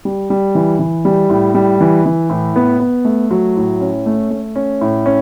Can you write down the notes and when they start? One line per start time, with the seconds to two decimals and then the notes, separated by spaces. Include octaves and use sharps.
0.05 G3
0.30 G3
0.55 E3
0.79 E3
1.05 G3
1.30 A2
1.55 G3
1.81 E3
2.06 E3
2.29 A2
2.56 B3
2.80 B3
3.05 A3
3.31 F#3
3.56 A2
3.81 C#4
4.06 A3
4.31 A3
4.56 C#4
4.81 A2
5.06 C#4